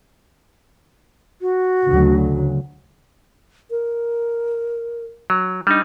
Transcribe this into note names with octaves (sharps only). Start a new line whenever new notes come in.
F#4
D2 C#3 F#3
A#4
F#3
G3 D4 D#4